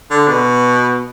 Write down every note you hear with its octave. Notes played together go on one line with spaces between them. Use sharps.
D3
B2